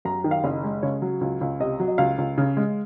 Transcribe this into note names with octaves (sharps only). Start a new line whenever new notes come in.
F#2 A#5
D#3
F5
F#1 D#5
G#3
C#3 C#5
F#3
C#2
C#2
C3 D#5
F#3
D#5
C#2 F5
C#2
C#3
G#3